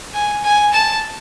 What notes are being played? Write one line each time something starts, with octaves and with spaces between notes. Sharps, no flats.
G#5
G#5
A5